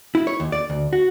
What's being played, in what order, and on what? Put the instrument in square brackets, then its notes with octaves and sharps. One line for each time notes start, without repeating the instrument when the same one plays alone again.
[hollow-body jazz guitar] E4
C#5
D#2
D5
D2
F#4